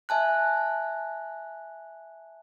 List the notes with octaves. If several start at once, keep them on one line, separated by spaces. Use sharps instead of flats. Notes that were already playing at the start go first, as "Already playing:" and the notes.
E5 G#5 A5 F#6